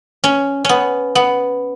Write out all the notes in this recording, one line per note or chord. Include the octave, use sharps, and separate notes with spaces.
C#4
B3 C#4
B3